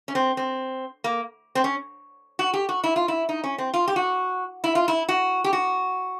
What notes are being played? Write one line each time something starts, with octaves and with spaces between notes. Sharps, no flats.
C#4
C4
C4
A#3
C4
C#4
F#4
G4
F#4
E4
F4
E4
D#4
C#4
C4
F4
G4
F#4
E4
F4
E4
F#4
G4
F#4